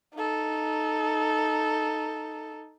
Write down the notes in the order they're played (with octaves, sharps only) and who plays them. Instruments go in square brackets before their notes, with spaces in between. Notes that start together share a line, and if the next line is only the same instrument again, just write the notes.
[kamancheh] D#4 A4